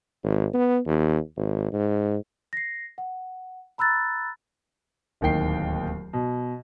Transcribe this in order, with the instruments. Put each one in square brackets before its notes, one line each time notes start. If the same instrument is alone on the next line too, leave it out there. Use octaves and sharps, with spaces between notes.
[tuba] G#1
B3
D#2
G#1
G#2
[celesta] A#6 C7
F#5
A#5 B5 E6 F#6 A6
[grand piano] D1 D#2 D#3 G5 C7
B2